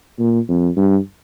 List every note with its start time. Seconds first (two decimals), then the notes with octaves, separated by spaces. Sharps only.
0.19 A#2
0.48 F2
0.77 G2